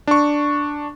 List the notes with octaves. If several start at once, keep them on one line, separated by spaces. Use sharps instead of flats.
D4 C#6